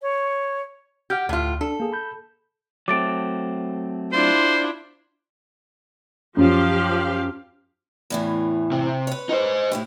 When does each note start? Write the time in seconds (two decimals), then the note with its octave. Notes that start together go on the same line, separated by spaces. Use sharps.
0.01 C#5
1.10 G4 F#5 F6 G6
1.29 D2 A2 F4
1.61 D4 A4
1.80 A#3 G#4
1.93 B5 G6
2.88 F#3 A3 C4 D6 A6 D7
4.13 D4 E4 F4 C5
6.37 F#2 F3 G4 F5
8.10 E2 A2 E3
8.71 C3
9.07 B4 C#5
9.29 D#4 C5
9.72 A2 E4 G4